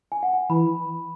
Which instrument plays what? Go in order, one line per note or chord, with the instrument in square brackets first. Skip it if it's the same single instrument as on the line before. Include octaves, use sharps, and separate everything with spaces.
[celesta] G#5
F#5
G#5
[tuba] E3 [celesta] B5